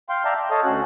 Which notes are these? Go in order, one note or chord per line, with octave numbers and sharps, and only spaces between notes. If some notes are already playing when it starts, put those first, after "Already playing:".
F5 G5 C6
D5 E5 F5 G5 A5 A#5
G5
A4 C#5 D#5 F5 A5 D#6
D2 C#4 F#4 F#6